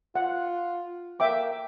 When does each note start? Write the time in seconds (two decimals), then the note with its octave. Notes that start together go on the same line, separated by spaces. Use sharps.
0.15 F4 F#5
1.20 A#3 E5 G5 D6